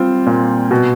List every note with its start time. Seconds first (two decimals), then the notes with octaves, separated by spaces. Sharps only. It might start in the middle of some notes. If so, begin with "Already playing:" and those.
Already playing: G3 C4 F4
0.26 A#2
0.71 B2